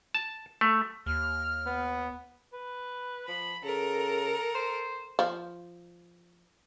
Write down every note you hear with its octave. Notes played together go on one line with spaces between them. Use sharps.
A5
A3
D#2 F6
B3
B4
F3 B5
C#3 A4 A#4
C5
F3